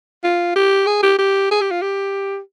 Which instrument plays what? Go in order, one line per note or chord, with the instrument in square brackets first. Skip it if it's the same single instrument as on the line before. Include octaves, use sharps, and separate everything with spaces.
[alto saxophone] F4
G4
G#4
G4
G4
G#4
G4
F4
G4